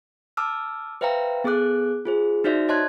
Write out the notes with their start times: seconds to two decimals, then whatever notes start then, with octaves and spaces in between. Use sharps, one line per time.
0.37 A5 D6 E6 F6
1.01 B4 C5 E5 F5 G5 A#5
1.44 B3 G#4 A4 D6 F#6
2.05 F4 G#4 C5
2.44 D#4 F#4 C5 D5 E5
2.68 C#5 D#5 A5 C6 F#6 G#6